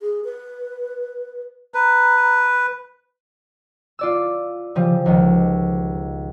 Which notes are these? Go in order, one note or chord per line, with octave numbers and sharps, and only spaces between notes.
G#4
B4
B4 A#5
F4 D5 E6
C#3 F3 G3
C#2 D#3